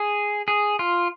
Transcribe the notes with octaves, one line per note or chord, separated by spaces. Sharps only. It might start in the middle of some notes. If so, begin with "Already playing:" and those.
Already playing: G#4
G#4
F4